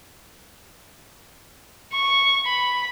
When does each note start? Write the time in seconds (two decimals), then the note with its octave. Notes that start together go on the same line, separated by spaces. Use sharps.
1.93 C#6
2.46 B5